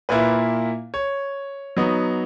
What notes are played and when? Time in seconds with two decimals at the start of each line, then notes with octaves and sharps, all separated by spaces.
0.09 A#2 A#3 E4 B4
0.94 C#5
1.77 F#3 B3 D#4